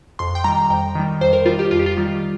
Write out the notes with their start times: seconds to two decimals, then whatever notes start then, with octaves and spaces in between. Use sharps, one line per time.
0.19 F2 C6
0.35 G5
0.44 D#3 G3 A#5
0.70 F2 G5
0.95 D#3 G3
1.21 F2 C5
1.33 A#4
1.46 D#3 G3 F4
1.59 G4
1.71 F2 F4
1.79 G4
1.86 F4
1.97 D#3 G3